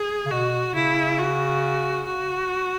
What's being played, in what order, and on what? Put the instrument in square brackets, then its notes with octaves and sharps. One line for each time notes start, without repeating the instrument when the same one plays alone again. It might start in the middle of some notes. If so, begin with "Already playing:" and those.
Already playing: [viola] G#4
[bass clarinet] C#3
[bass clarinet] B2 [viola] F#4
[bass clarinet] C#3 [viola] E4
[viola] F#4
F#4